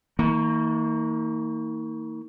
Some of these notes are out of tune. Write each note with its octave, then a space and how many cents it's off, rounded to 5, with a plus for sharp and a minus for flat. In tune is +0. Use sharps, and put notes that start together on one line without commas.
D#3 +45 A#3 -20